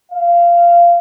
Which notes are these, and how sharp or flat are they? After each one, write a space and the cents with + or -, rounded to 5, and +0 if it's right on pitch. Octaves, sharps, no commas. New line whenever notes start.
F5 -15